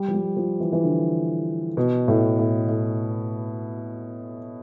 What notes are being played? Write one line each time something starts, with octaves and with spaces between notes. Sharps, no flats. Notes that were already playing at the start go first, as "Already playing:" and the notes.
Already playing: G3
F3
G3
F3
E3
E3
D3
B2
A2
A2
A2